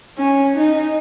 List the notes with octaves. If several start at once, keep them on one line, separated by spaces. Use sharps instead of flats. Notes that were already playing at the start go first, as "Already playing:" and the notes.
C#4
D#4